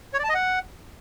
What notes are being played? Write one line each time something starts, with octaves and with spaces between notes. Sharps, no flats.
C#5
D5
A5
D#5
F#5